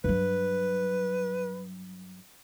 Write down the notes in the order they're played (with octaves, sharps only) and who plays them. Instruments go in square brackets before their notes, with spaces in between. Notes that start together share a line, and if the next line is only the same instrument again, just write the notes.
[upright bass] G2 F#3 [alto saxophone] B4